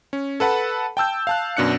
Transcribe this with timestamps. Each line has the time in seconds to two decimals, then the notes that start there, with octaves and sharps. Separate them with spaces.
0.13 C#4
0.40 A4 B4 F#5 A5 B5
0.97 G5 A5 E6 G6
1.27 F5 A5 F#6
1.57 F#2 B2 D4 F#6 C#7